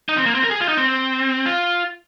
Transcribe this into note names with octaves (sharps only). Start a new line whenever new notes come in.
D#4
C4
A#3
C4
A#4
G#4
F4
D#4
C4
F4